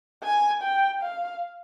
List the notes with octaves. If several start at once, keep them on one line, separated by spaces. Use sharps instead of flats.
G#5
G5
F5